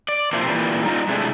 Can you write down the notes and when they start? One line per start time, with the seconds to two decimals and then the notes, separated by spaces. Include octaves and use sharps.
0.08 D5
0.33 C3 F3 A#3 E4 C5
0.45 A#2 E3 G3
0.85 G3 D#4 F4 D5 D#5
1.09 C3 G#3 A3 D4 E4